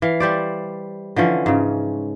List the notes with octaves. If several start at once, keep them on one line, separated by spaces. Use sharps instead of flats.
E3 F5
G3 C5 D5
D3 E3 F3 C#4
G#2 C#3